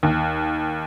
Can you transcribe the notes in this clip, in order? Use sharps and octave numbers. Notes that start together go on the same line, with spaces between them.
D#2